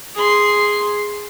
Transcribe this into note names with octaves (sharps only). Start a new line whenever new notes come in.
G#4 C6